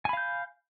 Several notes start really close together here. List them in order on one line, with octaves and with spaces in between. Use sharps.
G#5 B5 F5 G6